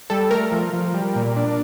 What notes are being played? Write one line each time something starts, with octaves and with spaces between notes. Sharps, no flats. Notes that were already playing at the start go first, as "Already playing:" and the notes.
G3 A4
A3 A#4
F3
F3
G3
A#2
D4